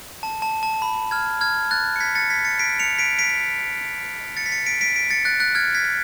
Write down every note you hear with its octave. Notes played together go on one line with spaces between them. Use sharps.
A5
A5
A5
B5
F6 G#6
F6 G#6
F#6 A6
C#7
G#6 B6
A6 C#7
G#6 B6
A6 C#7
B6 D7
C#7 F7
B6 D7
B6 D7
A6 C#7
B6
A6 C#7
B6 D7
B6 D7
B6 D7
A6 C#7
F#6 A6
F#6 A6
F6 G#6
G#6 B6